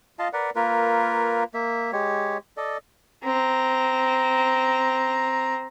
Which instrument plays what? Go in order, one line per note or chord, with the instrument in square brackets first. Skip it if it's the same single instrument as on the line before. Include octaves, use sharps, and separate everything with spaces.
[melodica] F4 D#5 F5 A5
A#4 B4 D5 F#5
A#3 F4 A#4 B4
A#3 E5
G#3 G4 C#5
A4 D5 D#5
[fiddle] C4 A#5